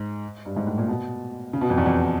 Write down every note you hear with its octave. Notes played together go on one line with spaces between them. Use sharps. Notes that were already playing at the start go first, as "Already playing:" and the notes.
Already playing: G#2
G2
G#2
A2
A#2
B2
C#3
B2
F2
E2
F2